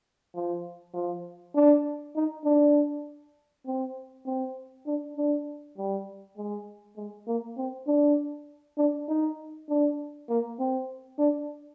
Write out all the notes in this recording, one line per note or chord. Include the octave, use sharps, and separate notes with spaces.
F3
F3
D4
D#4
D4
C4
C4
D4
D4
G3
G#3
G#3
A#3
C4
D4
D4
D#4
D4
A#3
C4
D4